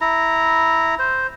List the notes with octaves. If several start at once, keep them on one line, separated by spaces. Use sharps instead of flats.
E4 A#5
C5